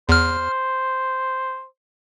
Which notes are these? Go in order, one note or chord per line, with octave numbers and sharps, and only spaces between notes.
E2 C5 F6